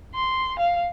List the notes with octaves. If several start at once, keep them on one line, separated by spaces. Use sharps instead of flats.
C6
F5